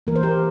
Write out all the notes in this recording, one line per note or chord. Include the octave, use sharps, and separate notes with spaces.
E3 A#3 A#4
C5
G4 A#4